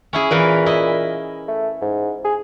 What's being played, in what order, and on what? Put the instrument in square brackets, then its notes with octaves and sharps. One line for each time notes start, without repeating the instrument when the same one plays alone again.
[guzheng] C#4 E4 G#4
[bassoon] A#2 [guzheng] E3 A#4 B4
[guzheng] E4 D#5
[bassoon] A3
G#2
G#4